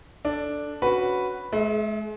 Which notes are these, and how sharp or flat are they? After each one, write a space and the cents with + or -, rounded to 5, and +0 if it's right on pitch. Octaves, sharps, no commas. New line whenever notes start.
D4 +0 A4 +0
C#4 +0 F#4 +0 B4 +0
G#3 +40 E5 +0